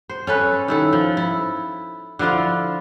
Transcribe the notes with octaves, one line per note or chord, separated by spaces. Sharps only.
C5
C#4 A4 B4
D#3 E4 A4
F3
E4
D3 F3 E4 F4